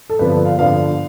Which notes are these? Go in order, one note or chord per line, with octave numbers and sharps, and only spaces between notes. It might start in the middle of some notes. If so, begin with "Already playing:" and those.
A4
G2 D3 F3 B3 B4
F5
G2 D3 F3 B3 F5